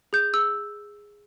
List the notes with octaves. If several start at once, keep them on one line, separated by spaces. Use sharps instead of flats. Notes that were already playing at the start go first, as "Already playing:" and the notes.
G#4 G6
G#4 E6